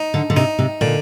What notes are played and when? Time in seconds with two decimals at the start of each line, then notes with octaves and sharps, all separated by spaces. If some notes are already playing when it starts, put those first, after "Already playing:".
Already playing: D#4
0.14 D3
0.30 D3
0.36 C3 D#4
0.59 C3
0.81 A#2 D3